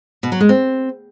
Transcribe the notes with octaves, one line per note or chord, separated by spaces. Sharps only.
B2
F#3
G#3
C4